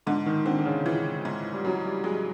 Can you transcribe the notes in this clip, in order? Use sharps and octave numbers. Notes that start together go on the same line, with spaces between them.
G#2 D3
D#3
D3 C4
D3
C#3
E3
G#2
G3
C#3 F#3
G3
F#3 G#3